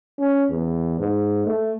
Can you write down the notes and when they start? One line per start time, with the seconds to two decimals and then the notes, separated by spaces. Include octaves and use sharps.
0.19 C#4
0.50 E2
0.99 G#2
1.46 A3